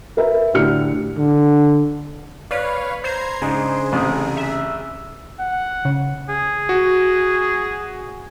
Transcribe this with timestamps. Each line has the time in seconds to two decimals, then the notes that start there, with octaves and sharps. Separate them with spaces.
0.17 A#4 B4 E5
0.53 A2 D3 G4 F6 C#7
1.18 D3
2.51 B4 C#5 D5 F5
3.04 C5 A#5 G#6 C7
3.42 G#2 C#3 D4 G#4
3.92 A1 C3 D#6
4.37 E5
5.40 F#5
5.85 C#3
6.29 G#4
6.69 F#4